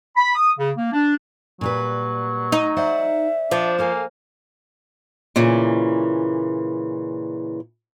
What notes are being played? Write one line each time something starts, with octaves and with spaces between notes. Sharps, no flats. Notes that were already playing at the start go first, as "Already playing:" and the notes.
B5
D#6
C#3
A#3
D4
A#2 F#3 G3 B4
D#4
C5 D5 E5 F#5
F3 D4
A#3 A4 F5 G#5
A#2 C#3 E3